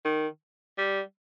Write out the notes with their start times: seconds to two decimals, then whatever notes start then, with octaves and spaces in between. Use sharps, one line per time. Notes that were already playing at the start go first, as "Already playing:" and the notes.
0.05 D#3
0.78 G3